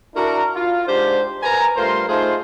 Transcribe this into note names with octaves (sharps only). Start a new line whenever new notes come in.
D4 E4 F#4 A#4
F4
G#2 D4 G4 C5
A#4 B4 G#5 A#5
G2 A3 F4 A#4 C5 C6
A3 D#4 F4 G#4 C5